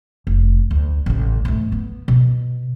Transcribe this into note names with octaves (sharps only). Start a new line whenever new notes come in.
F1
D2
A1 C#3
G#2 A3
B3
B2